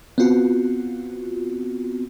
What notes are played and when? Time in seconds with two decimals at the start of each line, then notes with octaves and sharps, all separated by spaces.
0.18 B3 C4 F4 F#4